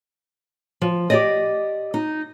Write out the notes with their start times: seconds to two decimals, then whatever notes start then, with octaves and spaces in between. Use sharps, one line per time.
0.81 F3
1.10 G4 D5 D#5
1.94 D#4